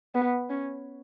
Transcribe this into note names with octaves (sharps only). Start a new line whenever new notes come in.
B3
C#4